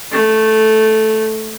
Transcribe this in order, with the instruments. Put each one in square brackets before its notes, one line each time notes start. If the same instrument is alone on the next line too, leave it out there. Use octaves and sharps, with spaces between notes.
[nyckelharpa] A3